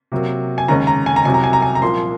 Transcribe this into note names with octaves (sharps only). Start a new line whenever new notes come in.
C3 F#3 A#3
G#5
D#2 C#3 G#3 C#4 A#5
A#5
G#5
A#5
C2 C3 F#3 G#5
A#5
G#5
A#5
G#5
A#5
C2 A#2 F3 A#3 C6